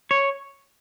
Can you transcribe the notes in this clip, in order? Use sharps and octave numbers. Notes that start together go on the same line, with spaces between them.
C#5